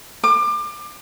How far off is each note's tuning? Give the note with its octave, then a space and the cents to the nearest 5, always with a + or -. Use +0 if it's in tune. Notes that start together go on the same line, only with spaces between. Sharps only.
D6 +30